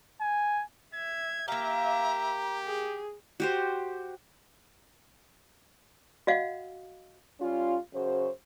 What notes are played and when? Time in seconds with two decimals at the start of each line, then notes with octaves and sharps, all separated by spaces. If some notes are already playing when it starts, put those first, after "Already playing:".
0.21 G#5
0.94 E5 G#6
1.48 A#3 G4 E5 F5 A#5
2.65 G#4
3.40 F#4 G4 C5
6.27 F#4 D#5 F5 F#5
7.40 G3 C#4 F4
7.93 F#2 C#3 F#4 C5